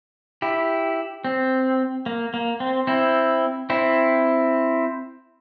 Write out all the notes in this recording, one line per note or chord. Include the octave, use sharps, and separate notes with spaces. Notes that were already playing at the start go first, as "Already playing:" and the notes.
E4 G4
C4
A#3
A#3
C4
C4 E4
C4 E4